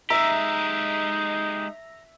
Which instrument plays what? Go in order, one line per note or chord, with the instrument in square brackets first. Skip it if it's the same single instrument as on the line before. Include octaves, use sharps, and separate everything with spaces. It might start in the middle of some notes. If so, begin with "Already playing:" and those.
[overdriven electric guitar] G#3 G4 [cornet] D#4 [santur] E5 [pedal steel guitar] A#5